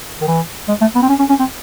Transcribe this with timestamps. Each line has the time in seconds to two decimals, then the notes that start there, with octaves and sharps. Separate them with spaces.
0.21 D#3
0.28 E3
0.68 G#3
0.81 A3
0.95 B3
1.03 C4
1.09 C#4
1.19 C#4
1.29 C#4
1.39 C4